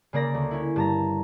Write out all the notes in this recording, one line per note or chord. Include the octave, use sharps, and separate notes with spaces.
C#3 A#3 D5 A#6
D2
C#4 E4
G2 A5 A#5